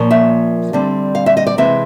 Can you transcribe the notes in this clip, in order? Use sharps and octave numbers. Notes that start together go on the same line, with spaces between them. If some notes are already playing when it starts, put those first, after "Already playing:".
Already playing: A#2 F3 A#3 C#4
E5
D3 G3 C4
F5
E5
D#5
D5
C3 E3 G#3 C4 E5